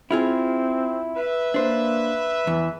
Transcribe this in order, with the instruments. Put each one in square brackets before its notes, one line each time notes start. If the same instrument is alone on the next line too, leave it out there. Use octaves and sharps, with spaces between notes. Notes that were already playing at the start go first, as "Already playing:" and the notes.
[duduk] C4 [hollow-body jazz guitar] E4 F4 G#4
[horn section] B4 E5
[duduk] A#3 [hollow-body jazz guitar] D4 C5
[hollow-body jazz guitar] E2 [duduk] E3